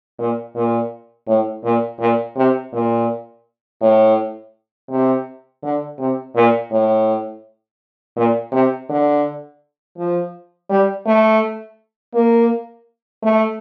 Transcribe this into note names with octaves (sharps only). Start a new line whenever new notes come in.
A#2
A#2
A2
A#2
A#2
C3
A#2
A2
C3
D3
C3
A#2
A2
A#2
C3
D3
F3
G3
A3
A#3
A3